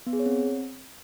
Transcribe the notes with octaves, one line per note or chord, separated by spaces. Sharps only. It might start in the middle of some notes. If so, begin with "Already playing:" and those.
B3
G#4
C#5
C4